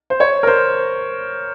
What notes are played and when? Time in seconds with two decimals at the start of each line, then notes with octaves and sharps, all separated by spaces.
0.10 C5
0.20 C#5
0.43 A#4
0.47 C5